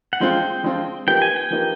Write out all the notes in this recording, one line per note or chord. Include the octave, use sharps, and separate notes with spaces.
F#5
F3 G#3 C4 F4 G5
F3 G#3 C4 F4
F3 A#3 D#4 G4 B4 G5
G#5
G5
F3 A#3 D#4 G4 B4